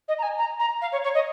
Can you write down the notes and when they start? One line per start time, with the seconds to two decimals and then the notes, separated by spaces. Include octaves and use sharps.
0.08 D#5
0.18 A#5
0.22 G#5
0.37 A#5
0.59 A#5
0.81 F5
0.92 C#5
1.03 C#5
1.14 D#5